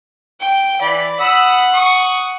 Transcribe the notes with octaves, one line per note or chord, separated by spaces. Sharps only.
G5
E3 D5 B5
F#5 B5 D#6 E6
C#6 D#6